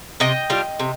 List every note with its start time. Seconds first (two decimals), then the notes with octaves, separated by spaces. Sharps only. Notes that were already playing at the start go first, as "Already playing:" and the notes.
0.20 C3 D#5 G5
0.50 G3 D4 F4
0.79 C3